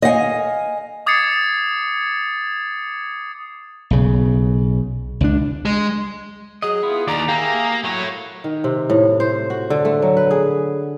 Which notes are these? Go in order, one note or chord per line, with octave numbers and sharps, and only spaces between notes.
D#5 F5 F#5 G#5
D6 D#6 G#6 A6 C7 C#7
B1 C#3
C#2 D4
G#3
F#3 G#4 D#5
B3 E4 F4
D#2 D5 A#5
A#3 G4 G#4 E5
F#3 A3 C#5
D#3
C3
A2
C5
F#4
D3
A3
F#3
B4
G#4